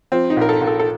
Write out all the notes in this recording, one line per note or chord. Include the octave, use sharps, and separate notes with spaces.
F3 C4
D#4
A#1 A#4
A4
A#1
A4
A4